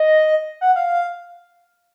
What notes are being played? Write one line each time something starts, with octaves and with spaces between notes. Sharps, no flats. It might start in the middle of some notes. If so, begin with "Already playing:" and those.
Already playing: D#5
F#5
F5